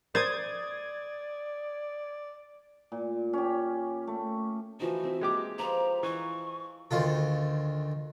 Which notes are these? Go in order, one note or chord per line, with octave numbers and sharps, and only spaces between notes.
C5 D5 D#6 G#6 A6
A#2
C#4 G4
A3
E3 F3 D#4 F#4
C4 E4 E5
G#3 A#3 G4 A#5 D6
F3 B4 A5 A#5
E3 D#5 C#6
D2 D#3 F4 A4